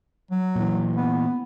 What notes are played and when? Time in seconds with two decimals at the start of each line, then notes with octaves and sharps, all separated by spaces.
0.31 F#3
0.55 A#2 E3
0.96 B3